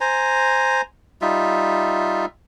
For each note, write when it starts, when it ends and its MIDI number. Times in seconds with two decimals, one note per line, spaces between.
0.01 0.81 72
0.01 0.81 80
0.01 0.81 82
1.22 2.26 55
1.22 2.26 63
1.22 2.26 65
1.22 2.26 76